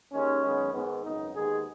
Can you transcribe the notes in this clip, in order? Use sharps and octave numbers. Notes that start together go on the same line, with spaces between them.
D#2 D#3 G#3 C#4
F#2 D#3 G#3 B3
G#2 D#3 G#3 B3
G#1 F#2 C#3 B3 D#4
D#2 D#3 G#3 B3 G#4